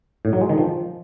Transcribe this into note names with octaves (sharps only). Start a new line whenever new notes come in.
A2
F#3
G#3
D#3
F3